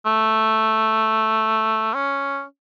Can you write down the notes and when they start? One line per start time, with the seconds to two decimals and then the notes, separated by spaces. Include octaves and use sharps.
0.05 A3
1.94 C#4